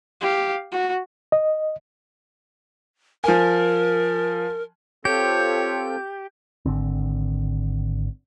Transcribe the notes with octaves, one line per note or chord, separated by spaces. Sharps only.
G4 F5
F#4
D#5
F3 A#4 G#5
C4 F4 G4 A4 C#5 G6
G#1 D3 C4